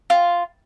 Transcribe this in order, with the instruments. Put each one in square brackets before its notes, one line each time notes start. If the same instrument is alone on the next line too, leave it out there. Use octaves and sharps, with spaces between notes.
[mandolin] F4